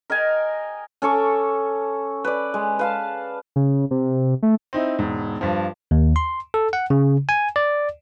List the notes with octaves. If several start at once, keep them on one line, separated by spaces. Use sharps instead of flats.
A#4 D#5 G5 G#5
C#4 A4 C#6 D6
B4 D5
G#3
B4 F5 A5
C#3
C3
A3
C4 D#4 E4
E1 G#2
G2 F3
D#2
C6
A4
F#5
C#3
G#5
D5